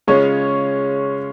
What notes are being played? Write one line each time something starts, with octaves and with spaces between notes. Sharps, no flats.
C#3 G#3 C#4 F4 C#5